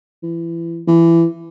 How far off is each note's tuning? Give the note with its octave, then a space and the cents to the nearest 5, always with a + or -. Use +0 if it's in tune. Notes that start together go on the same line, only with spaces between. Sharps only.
E3 +25
E3 +20